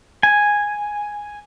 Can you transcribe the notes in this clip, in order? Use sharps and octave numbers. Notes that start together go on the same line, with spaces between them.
G#5